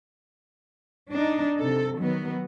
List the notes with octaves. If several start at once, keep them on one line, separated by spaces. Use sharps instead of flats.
D4 D#4
C3 A4
D#3 F#3 B3